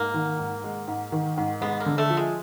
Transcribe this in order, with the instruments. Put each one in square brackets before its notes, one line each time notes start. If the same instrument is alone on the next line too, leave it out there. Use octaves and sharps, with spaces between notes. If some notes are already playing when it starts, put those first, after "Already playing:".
Already playing: [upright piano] G#2 [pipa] A#3
[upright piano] D#3
G#2
G#3
G#2
D#3
G#2
[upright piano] G#3 [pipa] B3
[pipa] A#3
[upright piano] D3
[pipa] A3
[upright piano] F3
[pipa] G#3